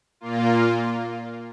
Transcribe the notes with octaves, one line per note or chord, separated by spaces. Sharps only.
A#2 A#3 F4